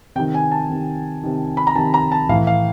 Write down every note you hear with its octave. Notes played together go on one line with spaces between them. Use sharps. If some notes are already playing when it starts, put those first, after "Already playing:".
C3 D#3 G5
G#5
A5
C3 D#3
C3 D#3
B5
A#5
C3 D#3 A5
A#5
A5
A2 E3 F5
F5